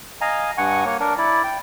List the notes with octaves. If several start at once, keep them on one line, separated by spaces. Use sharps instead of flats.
D#5 F5 G#5 A#5
G2 F#5 G#5 C#6
A#3 C#5
D4 A#4
E4 D5
G5